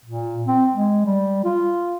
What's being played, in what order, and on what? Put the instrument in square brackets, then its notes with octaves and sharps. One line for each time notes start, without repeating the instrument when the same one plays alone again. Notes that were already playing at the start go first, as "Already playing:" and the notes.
[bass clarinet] A#2
C4
G#3
G3
F4